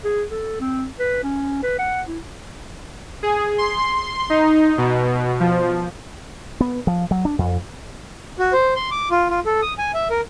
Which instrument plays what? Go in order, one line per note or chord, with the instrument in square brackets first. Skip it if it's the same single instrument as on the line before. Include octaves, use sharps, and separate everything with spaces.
[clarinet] G#4
A4
C4
B4
C#4
B4
F#5
E4
[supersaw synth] G#4
C6
D#4
B2
F3
[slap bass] B3
F3
F#3
D4
F2
[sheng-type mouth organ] F#4
C5
C6
D6
F4
F4
A4
D#6
G#5
E5
A#4